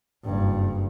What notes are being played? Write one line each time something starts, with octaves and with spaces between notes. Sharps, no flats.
F#1 G2